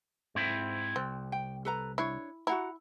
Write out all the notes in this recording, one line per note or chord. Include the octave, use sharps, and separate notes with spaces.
G#2 C4 E4
C2 C4
G5
A4 B4 A#5
D4 E4 C#5
E4 F#4 F#5 A#5